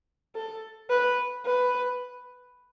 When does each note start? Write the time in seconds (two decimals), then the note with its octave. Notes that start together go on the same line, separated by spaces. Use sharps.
0.35 A4
0.90 B4
1.46 B4